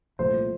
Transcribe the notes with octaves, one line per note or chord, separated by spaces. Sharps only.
C2 A#2 F3 A3 C5